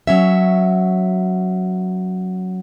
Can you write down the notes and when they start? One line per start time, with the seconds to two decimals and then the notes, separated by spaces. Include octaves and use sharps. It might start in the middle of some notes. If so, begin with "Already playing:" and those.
0.07 F#3 C#4 E5